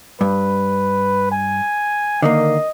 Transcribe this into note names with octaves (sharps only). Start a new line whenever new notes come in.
G2 B4
G#5
D3 D#3 A#3 D#5